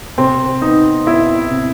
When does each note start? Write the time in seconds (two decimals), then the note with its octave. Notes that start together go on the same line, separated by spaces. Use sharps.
0.18 C3 C4
0.62 B3 D#4
1.07 B3 E4
1.51 C3